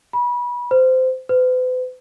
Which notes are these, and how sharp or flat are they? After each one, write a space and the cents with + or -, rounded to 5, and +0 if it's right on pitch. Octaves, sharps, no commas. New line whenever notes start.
B5 -25
C5 -20
B4 +45